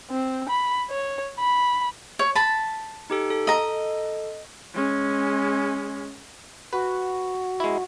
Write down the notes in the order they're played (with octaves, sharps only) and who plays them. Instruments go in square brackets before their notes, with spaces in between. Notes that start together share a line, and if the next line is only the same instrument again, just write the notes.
[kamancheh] C4
B5
C#5
B5
[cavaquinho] C#5
A5 B5
[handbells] D#4 G4 A4
A4
[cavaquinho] D#5 A#5
[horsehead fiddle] G#3 C#4
[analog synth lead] F#4 [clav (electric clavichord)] B4
[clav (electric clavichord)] G#3 E4